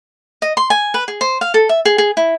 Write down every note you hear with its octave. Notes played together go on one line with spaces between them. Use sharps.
D#5
C6
G#5
B4
G#4
C5
F5
A4
E5
G#4
G#4
E4